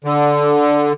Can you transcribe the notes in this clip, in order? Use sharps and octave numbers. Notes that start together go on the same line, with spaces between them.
D3